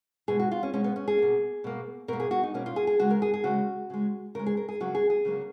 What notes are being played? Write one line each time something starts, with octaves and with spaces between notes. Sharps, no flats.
B2 G#3 G#4
F#4
F4
C#4
B2 G#3 C#4
B3
C#4
G#4
B2 A#3
B2 A#3
B2 A#3 A#4
G#4
F#4
D#4
B2 A#3 C#4
F4
G#4
G#4
C#3 G#3 F#4
A#4
G#4
G#4
C#3 G#3 F#4
C#3 G#3
C#3 G#3 A#4
G#4
A#4
G#4
C#3 F#3 A#3 F#4
G#4
G#4
C#3 F#3 A#3